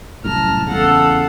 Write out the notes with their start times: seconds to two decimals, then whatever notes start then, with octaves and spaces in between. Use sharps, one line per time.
0.24 C2 F#2 A2 A5 A#5 F6
0.67 E2 C#3 A4 F5 F#5